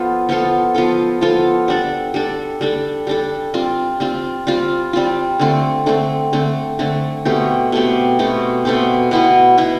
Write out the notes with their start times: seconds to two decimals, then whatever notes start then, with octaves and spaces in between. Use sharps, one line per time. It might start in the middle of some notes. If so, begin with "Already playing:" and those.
Already playing: F3 B3 F4 A4
0.29 F3 B3 F4 A4
0.75 F3 B3 F4 A4
1.21 F3 B3 F4 A4
1.68 G3 D4 A4
2.14 G3 D4 A4
2.61 G3 D4 A4
3.07 G3 D4 A4
3.54 G3 C4 F4
4.00 G3 C4 F4
4.47 G3 C4 F4
4.93 G3 C4 F4
5.39 D3 A3 C4
5.86 D3 A3 C4
6.33 D3 A3 C4
6.79 D3 A3 C4
7.25 B2 A3 C4 G4
7.72 B2 A3 C4 G4
8.19 B2 A3 C4 G4
8.65 B2 A3 C4 G4
9.11 B2 B3 E4 B4
9.58 B2 B3 E4 B4